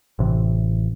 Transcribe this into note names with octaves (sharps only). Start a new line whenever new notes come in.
A1 C3 E3